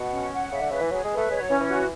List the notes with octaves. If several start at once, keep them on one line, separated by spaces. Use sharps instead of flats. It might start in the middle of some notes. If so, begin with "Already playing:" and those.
Already playing: B2 F#5
C#4
F#5
C#3 E5
D3
C#3 B4
E3
F#3 G#4
G#3
B4
A3
G#3 C#5
F#3
E3 C#4
E3
F#4